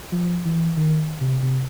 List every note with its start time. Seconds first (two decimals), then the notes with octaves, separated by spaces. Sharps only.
0.12 F3
0.45 E3
0.77 D#3
1.21 C3
1.42 C3